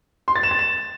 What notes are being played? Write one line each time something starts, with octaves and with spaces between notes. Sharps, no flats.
C6
A6
E7
A6
E7